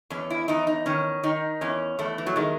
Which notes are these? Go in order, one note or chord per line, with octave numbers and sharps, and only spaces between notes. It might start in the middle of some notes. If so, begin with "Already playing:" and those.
E2 C#4
E4
E2 D#4
D#4
D#3 C#4
D#3 D#4
E2 C#4
E2 A3
E3
F#3
D#3 G#3